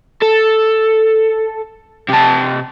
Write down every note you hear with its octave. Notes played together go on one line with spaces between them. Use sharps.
A4
C3 A5